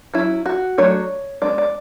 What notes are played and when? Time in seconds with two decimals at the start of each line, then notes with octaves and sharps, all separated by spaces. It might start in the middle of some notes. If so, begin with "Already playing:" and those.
0.14 F#3 C#4 E4
0.46 F#4
0.78 F#3 A3 D4 C#5
1.42 G#3 B3 D4 D5
1.58 D5